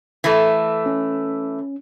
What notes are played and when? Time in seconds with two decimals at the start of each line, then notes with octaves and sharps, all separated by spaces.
0.24 E3 A3
0.86 C#4